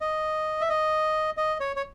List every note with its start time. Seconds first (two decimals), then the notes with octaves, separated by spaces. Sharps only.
0.01 D#5
0.61 E5
0.69 D#5
1.37 D#5
1.60 C#5
1.76 C#5